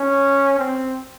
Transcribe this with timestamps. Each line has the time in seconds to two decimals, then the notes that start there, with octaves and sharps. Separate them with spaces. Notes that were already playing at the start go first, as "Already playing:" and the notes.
Already playing: C#4
0.59 C4